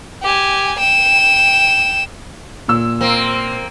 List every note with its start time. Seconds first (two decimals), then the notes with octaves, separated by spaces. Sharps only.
0.23 G4 G#5
0.79 G5 E7
2.68 A#2 E6
3.01 A#3 C4